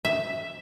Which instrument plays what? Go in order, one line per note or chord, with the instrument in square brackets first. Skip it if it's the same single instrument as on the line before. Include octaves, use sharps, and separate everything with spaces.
[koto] E5